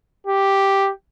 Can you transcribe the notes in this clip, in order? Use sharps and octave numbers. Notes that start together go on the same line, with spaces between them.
G4